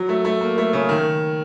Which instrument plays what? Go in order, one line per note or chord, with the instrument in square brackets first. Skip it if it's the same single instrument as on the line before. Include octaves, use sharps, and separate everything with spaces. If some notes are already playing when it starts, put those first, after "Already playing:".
Already playing: [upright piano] F#3
A3
A3
A#3
A3
C#3
D#3